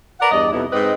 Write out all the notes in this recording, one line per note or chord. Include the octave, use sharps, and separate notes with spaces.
A#4 B4 D5 F#5
E2 G2 D5 D#5
F2 C3 B3 D#4 E4
G#2 C4 B4 D#5